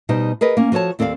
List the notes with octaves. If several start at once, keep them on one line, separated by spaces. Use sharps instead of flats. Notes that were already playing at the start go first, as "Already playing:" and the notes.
B2 G3 D#4 C5
G#4 A#4 B4 D#5
A#3 C#4
F3 F#4 A4 C#5 A5
D#2 C4 A4 D5 F5